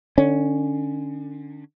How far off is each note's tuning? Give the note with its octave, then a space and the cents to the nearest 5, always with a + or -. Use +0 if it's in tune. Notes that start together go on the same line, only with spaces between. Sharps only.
D3 +30 C#4 +0